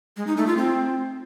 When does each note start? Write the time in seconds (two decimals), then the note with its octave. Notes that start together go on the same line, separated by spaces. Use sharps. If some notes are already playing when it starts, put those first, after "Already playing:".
0.17 G#3
0.27 D#4
0.37 A3
0.47 F4
0.57 C4